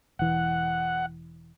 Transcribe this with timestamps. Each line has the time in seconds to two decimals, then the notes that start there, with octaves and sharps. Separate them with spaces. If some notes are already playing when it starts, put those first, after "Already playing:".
0.19 E1 E3 F#5